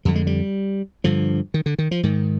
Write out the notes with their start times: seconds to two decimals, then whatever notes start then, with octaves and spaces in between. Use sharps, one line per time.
0.05 F2 D3 G3
0.15 G#3
0.27 G3
1.04 G2 D3 F3
1.54 D#3
1.66 D3
1.79 D#3
1.91 F3
2.03 G#2 D#3